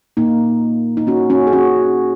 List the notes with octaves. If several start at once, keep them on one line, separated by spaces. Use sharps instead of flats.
A#2 A#3 D#4
D#4
C#4 F#4
C#4 F#4
G#4
C#4 F#4